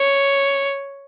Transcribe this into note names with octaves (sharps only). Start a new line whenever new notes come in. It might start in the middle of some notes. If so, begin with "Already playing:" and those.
Already playing: C#5